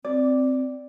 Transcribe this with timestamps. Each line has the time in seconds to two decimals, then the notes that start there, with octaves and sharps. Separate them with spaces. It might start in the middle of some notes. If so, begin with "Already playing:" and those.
0.05 C4 D5